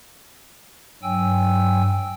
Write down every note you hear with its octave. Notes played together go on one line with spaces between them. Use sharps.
G2 F#3 G5 G#5 E6